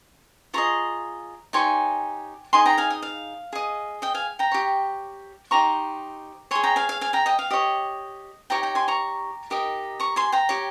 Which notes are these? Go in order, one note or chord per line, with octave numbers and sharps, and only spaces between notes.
F4 G#4 D#5 A#5 C#6
D#4 G4 C#5 G#5 C6
D#4 G#4 D#5 G#5 C6
G5 A#5
F5 G#5
D#5
F5
G#4 D#5
D#5 G5
F5 G#5
G5 A#5
G4 C#5
D#4 G4 C5 A#5 C#6
G#4 C#5 G#5 C6
G5 A#5
F5 G#5
F5
F5 G#5
G5 A#5
D#5 G5
F5
G4 C#5 D#5
D#4 G4 C#5 G5 A#5
G5 A#5
G#5 C6
A#5 C#6
D#4 G4 A#4 D#5
A#5 C#6
G#5 C6
G5 A#5
G4 C#5